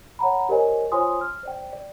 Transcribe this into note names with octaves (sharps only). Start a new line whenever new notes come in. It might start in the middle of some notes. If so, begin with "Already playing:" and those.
C#5 F#5 A#5 B5
G4 A#4 C5 C#5 D#5 G#5
F4 C5 C#5 G#5 C6 D#6
F6
C5 D5 G5
D5